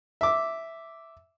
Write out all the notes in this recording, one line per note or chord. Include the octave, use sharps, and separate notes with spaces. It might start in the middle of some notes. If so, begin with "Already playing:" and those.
E5 D6